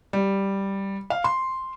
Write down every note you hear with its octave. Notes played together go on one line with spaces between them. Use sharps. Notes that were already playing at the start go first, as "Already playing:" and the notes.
G3
F5
C6